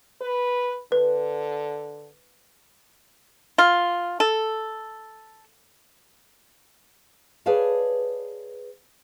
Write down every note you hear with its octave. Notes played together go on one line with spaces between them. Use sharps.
B4
D3 B4
F4
A4
G#4 B4 C#5 D5 F5 A5